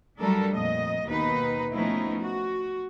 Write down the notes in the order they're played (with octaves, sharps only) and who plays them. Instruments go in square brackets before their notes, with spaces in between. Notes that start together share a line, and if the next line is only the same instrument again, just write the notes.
[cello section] F#3 G3 A3 D4 A4 A#4
F2 A#2 D#5
D#2 B2 D#3 D#4 B4
F3 A3 B3 C#4 D#4 E4
F#4